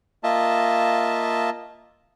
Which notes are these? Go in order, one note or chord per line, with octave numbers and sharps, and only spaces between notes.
A#3 F4 D#5 E5 A5